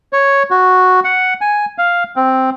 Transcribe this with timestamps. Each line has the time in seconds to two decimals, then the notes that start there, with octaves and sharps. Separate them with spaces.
0.13 C#5
0.51 F#4
1.04 F#5
1.41 G#5
1.78 F5
2.16 C4